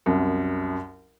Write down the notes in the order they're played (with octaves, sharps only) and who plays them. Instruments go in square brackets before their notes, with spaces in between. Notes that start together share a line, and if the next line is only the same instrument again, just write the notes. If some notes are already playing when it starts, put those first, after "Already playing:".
[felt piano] C2 F#2